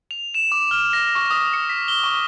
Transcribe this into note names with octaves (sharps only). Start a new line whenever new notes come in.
F7
E7
D6
F6
A#6
C#6
D#6
C#7
B6
G7
C#6